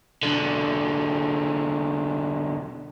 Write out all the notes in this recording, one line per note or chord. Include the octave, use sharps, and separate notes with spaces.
B1 D3